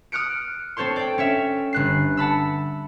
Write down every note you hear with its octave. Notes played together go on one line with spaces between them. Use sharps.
D#6 F6 F#6 C#7 D7
C4 A4 C5 C#5 C6
D5 G5
C#4 C#5 E5
G1 F#6 C7
F#5 A5 B5 E6